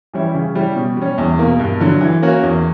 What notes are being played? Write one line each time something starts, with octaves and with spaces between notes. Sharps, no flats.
E3 G3 C#4 E4
C#3
G3 C#4 E4
B2
G3 C#4
E2
B2 A#3
G2
D3 F#3
E3
A#3 C#4 F#4
E2